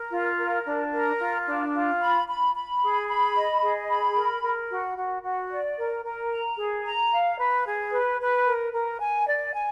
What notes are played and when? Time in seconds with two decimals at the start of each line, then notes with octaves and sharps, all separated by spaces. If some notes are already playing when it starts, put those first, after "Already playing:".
Already playing: A#4
0.12 F4
0.38 A#4
0.66 D4
0.92 A#4
1.19 F4
1.46 D4
1.74 F4
2.01 B5
2.28 B5
2.54 B5
2.82 G#4
3.08 B5
3.35 D#5
3.62 G#4
3.88 B5
4.16 A#4
4.43 A#4
4.70 F#4
4.97 F#4
5.23 F#4
5.50 D5
5.78 A#4
6.04 A#4
6.31 A#5
6.58 G#4
6.85 A#5
7.11 F5
7.39 B4
7.66 G#4
7.92 B4
8.20 B4
8.46 A#4
8.73 A#4
9.00 G#5
9.28 D5
9.53 G#5